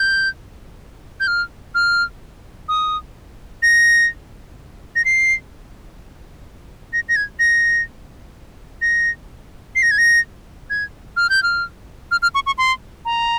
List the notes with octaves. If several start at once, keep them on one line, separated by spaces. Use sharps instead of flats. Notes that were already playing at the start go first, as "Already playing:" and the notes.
Already playing: G6
G6
F6
F6
D#6
A#6
A#6
C7
A#6
A#6
G#6
A#6
A#6
C7
A#6
G#6
A#6
G#6
F6
G6
F6
F6
F6
C#6
C#6
C6
A#5